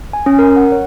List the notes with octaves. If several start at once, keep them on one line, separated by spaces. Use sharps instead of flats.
G#5
C#4
A#4
F#5
C#5